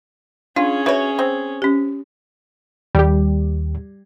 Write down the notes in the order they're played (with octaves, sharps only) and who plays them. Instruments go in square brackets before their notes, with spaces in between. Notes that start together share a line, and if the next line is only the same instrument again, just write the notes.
[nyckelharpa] C#4 G#4 [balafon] D4 [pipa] F4
[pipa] F#4 C#5 [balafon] B4 E5
[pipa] C4
[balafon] C#4 G4
[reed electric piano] D#2 [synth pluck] G3 G4